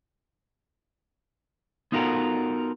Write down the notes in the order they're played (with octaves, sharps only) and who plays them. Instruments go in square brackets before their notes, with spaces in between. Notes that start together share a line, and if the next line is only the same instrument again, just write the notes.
[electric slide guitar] B3 D#4 F4 F#4 A4 A#4